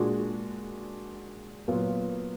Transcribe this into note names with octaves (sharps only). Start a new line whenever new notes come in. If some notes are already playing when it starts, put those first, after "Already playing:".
Already playing: A#2 G#3 D4 F#4
A#2 F#3 B3 F4